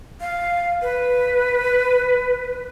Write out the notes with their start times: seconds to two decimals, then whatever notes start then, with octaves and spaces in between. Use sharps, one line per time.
0.21 F5
0.82 B4